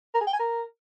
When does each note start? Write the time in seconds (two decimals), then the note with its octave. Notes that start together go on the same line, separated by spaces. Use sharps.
0.14 A#4
0.21 G#4
0.27 G5
0.33 G#5
0.39 A#4